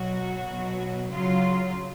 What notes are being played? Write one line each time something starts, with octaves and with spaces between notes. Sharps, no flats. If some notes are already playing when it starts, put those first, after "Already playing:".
Already playing: B2 F#3 F#4
B2 F#3
C#3 F#3 F4